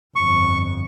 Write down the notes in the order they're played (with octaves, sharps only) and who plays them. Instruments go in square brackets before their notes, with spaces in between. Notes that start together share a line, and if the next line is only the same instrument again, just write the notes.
[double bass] G1 F2 [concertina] C#6